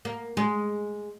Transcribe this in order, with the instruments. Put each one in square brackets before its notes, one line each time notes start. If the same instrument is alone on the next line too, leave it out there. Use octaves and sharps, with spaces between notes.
[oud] A#3
G#3